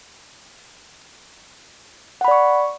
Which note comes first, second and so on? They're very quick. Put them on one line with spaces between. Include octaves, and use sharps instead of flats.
F#5 B5 D5 C#6